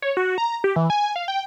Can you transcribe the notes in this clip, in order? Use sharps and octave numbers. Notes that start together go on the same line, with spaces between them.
C#5
F#4
A#5
G4
E3
G#5
F5
G5